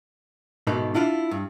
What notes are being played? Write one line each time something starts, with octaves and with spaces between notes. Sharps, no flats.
G#2 B2 D#3 A3 D#4
D4 E4 F4 F5
G2